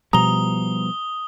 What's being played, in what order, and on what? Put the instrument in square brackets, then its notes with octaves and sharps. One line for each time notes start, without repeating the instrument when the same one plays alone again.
[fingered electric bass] B2 F3 G3 [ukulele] A#5 [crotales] D#6 G7